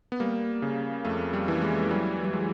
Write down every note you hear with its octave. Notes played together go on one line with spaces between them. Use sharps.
B3
G3 A#3
C#3
F2 A3
G3
E3
G#3
F#3 G3
G3
F#3 G#3